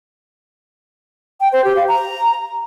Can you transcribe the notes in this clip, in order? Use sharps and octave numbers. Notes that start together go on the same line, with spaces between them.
G5
C5
G4
F5
A#5